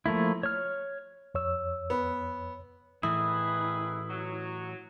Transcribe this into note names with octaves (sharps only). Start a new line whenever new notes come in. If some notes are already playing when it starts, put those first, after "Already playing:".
F3 A3 A#3 E4
C#5 F6
F2 C#5 E6
B3
A2 D#3 E3 E4 G#4 B4 D#6
F#3